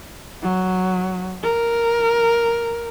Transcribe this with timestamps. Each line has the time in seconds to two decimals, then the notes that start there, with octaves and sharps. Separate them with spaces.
0.42 F#3
1.43 A#4